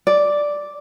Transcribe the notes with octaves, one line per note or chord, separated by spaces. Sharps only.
D5